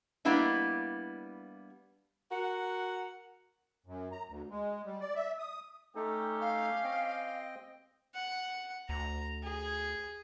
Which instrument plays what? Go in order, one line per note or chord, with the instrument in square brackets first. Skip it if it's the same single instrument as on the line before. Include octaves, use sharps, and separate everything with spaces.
[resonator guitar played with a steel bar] G3 A#3 B3 D4 E4 D#5
[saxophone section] F#4 A#4 F#5
[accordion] F#2
A#5
D2
G#3
G3
D5
E5
D#6
[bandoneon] A3 D#4 A4 [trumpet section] C#4 G4
[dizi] F5
[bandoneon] C4 D#5 G5
[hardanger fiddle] F#5
[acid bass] D2 [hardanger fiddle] A#5
[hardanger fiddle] G#4